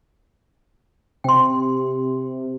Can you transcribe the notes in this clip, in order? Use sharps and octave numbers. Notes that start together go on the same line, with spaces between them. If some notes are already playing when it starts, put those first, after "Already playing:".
C3 G5 C6